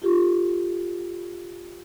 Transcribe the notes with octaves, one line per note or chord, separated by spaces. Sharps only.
F4 G4 A4